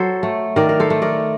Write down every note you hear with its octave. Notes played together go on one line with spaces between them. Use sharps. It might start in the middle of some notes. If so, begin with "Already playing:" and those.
Already playing: F#3 A4 C5
A3
D#3 A#4 D5
A#4
A4 C5
A3
A#4 D5